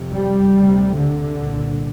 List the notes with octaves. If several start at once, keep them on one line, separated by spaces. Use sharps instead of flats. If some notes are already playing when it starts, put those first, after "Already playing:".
Already playing: F2 C3
G3
D2 C3
D3
C2 A#2